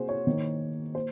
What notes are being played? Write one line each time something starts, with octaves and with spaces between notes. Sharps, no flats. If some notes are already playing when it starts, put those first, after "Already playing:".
Already playing: C3 A#3 F#4 G#4 C5
C#5
D#3 A#3
A#3 C5